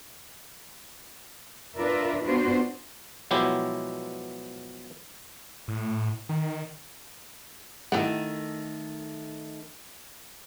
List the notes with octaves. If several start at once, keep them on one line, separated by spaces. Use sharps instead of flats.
D4 F4 A#4 B4 D5 E5
B3 D4 F4 F#4 B4 C5
B2 F3 F#3 G#3 E4 G4
A2
D#3
D#3 A3 E4 G4 F#5